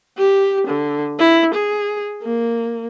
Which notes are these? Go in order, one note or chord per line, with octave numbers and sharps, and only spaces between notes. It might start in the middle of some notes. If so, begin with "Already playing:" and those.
G4
D3
E4
G#4
A#3